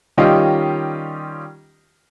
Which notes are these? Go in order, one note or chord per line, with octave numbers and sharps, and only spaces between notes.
D#3 G3 C#4 F4 G4 D#5